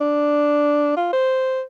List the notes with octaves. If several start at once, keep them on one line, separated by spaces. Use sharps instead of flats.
D4
F4
C5